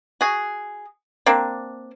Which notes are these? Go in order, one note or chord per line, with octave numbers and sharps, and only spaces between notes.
F#4 G#4
A#3 C4 D4